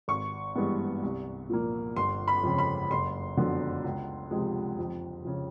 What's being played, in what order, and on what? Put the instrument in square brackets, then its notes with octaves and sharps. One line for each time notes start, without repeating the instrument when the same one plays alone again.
[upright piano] G#1 C#6
G2 E3 G#3 B3
C2
A#2 F3 A#3
G1 C6
B5
F2 C#3
B5
F#1 C6
F2 D3 F#3 B3
C#2
C3 F3 G#3
F2
C#3 F3